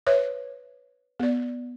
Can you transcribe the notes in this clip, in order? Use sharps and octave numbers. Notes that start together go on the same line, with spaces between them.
B4 C#5 E5
B3 D5